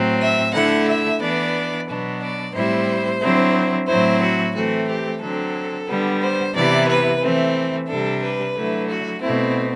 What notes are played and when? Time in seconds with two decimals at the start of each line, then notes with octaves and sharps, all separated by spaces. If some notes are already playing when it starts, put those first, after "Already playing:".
Already playing: A2 F#3 C4
0.20 E5
0.53 D3 A3 E4 F#5
0.87 E5
1.20 E3 B3 D4 D5
1.88 B2 F#3 B3 D4
2.20 D5
2.54 A2 G3 C4 E4 C5
3.21 D3 F#3 C4 E4
3.88 A2 F#3 C4 E4 C5
4.21 F#4
4.54 E3 A3 C4 F#4
4.87 G4
5.21 D3 F#3 C4 A4
5.87 D3 G3 B3
6.21 C5
6.55 C3 E3 B3 E4 D5
6.88 B4
7.22 E3 A3 C4
7.87 C3 G3 D4 A4
8.22 B4
8.54 D3 F#3 A3 E4
8.89 F#4
9.21 B2 A3 C4 E4